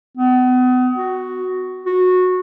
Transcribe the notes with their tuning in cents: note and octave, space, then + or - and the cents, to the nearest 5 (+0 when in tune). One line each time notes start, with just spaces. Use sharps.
B3 +35
F#4 +0
F#4 -15